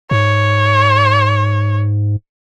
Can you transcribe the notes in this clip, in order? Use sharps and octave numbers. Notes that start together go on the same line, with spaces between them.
G#2 C#5